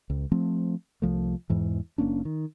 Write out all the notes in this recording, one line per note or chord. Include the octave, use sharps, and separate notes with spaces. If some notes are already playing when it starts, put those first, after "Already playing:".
C#2
F3 A3 C4
C2 F3 A3
E2 G#2 E3
F#1 A#3 C#4 D4
D#3